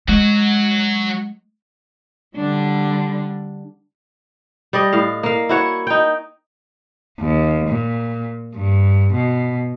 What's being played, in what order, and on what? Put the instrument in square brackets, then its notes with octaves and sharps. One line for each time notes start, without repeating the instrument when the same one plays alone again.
[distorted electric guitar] F#3 F#4 [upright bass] G#3
[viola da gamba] D3 G3 D4
[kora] G3 D5 D#5
A2 F5
A#3 F5
E4 F#4 C#5
D#4 G5
[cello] D#2
A#2
G2
B2